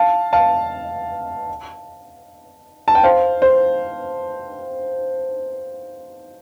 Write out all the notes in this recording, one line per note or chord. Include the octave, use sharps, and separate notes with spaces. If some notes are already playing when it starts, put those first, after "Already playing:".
Already playing: F5 A5
F5 A5
A5
G5
C5 F5
C5